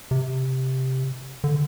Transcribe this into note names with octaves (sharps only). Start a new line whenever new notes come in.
C3
D3